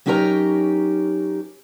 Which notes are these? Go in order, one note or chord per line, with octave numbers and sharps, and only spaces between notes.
F#3 C#4 D#4 G4 A#4 A#5